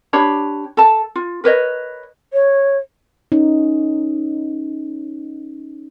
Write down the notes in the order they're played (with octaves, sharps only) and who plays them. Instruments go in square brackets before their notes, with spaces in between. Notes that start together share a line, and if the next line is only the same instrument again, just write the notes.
[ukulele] D4 G4 C#5 B5
A4 A5
F4
A#4 B4 C#5 D#5
[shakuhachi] C#5
[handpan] C#4 D#4